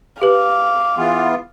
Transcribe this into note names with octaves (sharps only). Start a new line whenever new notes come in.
G4 B4 F5 D6
E3 B3 F4 G#4